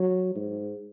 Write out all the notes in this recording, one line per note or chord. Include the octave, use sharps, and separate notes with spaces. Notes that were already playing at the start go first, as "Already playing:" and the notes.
Already playing: F#3
G#2